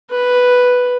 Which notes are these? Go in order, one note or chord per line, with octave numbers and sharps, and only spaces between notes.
B4